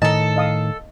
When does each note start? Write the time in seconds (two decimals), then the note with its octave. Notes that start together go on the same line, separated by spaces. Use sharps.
0.02 A2 D#3 A4 D#5 A5 A#5
0.36 D#5 F5 D#6